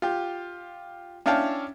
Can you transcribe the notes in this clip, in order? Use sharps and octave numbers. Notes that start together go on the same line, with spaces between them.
F4 G4
C#4 D4 E4 F5 G5 A5